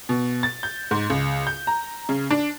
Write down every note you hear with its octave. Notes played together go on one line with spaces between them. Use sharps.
B2
A6
G6
G#2
C#2
G6
A#5
C#3
D4